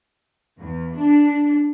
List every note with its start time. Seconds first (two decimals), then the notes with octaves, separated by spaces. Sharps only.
0.58 E2
0.97 D4